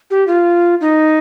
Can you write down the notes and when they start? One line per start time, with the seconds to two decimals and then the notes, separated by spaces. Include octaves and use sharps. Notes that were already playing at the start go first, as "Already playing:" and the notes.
0.11 G4
0.27 F4
0.81 D#4